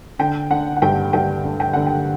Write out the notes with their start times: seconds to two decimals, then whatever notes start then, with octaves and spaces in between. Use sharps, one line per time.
0.19 D3 G5
0.50 D3 F#5
0.77 F#5
0.82 G2 G5
1.13 G2 G5
1.44 D3
1.60 G5
1.73 D3 F#5
1.87 G5